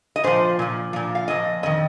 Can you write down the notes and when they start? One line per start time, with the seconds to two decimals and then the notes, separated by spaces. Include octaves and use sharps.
0.16 D#5
0.24 A#2 F3 C5
0.59 A#2 F3
0.93 A#2 F3
1.15 F5
1.28 A#2 F3 D#5
1.63 F2 D#3 D#5